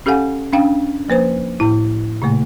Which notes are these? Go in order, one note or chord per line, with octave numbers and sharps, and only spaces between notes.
C#4 G4 A4 F5 F#5 G#5
C#4 D4 F5 G5
F3 A#3 B4 C5
A2 E4
A#2 C#3 A3 A#3